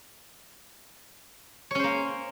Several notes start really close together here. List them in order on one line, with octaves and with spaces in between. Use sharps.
C#5 C#4 C5 A#3